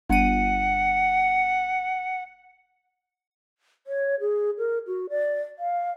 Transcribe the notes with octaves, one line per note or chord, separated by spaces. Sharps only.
G1 F#5 D#7
C#5
G#4
A#4
F#4
D5
F5